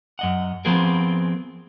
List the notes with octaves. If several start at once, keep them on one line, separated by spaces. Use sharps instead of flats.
F#2 D#5 F#5
F3 B3 C4 G#4 A#4